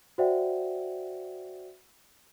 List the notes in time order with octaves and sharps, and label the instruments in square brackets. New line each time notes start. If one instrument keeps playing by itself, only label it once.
[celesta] F#4 C5 D5 E5 F#5 G5